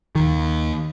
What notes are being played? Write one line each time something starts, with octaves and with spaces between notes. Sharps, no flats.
D#2 D#3